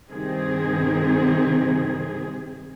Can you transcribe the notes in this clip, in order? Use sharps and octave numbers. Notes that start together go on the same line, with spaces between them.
G2 C3 D#3 C4 G#4